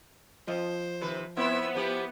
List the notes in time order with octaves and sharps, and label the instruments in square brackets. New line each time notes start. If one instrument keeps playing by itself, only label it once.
[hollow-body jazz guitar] F3 F4 D#5 [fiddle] C5
[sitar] C3 D#3 B4
[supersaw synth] B3 [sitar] C4 E4 [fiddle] E5 E6
[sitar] F3 G4 [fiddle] E4